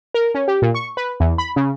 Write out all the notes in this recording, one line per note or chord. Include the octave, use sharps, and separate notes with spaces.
A#4
C#4
G4
A#2
C#6
B4
E2
B5
C#3